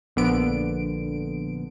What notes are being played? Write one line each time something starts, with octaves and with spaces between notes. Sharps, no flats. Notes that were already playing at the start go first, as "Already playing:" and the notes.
A#1 D3 B3 D7